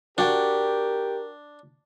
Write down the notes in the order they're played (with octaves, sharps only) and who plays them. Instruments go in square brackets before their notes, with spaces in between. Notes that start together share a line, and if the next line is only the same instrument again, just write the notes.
[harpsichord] D4 [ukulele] F#4 D5 G5 [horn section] G4 [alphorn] A#4